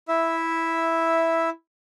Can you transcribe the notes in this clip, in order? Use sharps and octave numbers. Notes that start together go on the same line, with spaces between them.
E4 E5